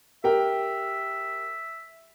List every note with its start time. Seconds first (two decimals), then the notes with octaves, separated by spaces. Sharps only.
0.24 G4 A#4 E5 G5